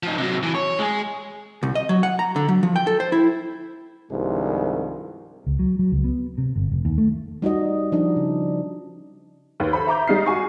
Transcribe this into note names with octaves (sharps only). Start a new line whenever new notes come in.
F3 D#4
C3 F#3
E3
C#5
G#3 G#4
C2
D#5
F#3
F#5
A#5
D3
F#3
F3
G5
A4
C5
E4
C2 G2 D#3 F3 G#3
C#2
F#3
F#3
C#2
B3
C3
G1
F1
D#2
A3
G3 D#4 F#4 D#5
F3 D4 D#4
C#3
D#2 B4
A4 C5 B5
E5 A#5 D6 G6
G3 G#3 D#4 F6 C7
F#4 G#5 C#6